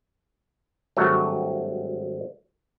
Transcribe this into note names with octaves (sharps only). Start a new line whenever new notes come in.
G#1 G2 F#3 A3 F#4